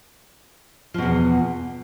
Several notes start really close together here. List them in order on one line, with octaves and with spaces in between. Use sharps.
F3 B2 E2